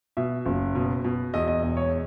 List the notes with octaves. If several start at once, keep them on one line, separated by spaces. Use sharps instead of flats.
B2 E5
F#1
B2
B2
E2 D#5
D#5
E1 D#5
C#5